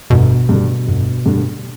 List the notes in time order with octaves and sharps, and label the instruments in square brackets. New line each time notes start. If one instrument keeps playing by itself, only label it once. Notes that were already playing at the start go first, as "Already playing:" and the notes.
[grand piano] G1 [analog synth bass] B2
[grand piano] G2 D3
G1
G2 D3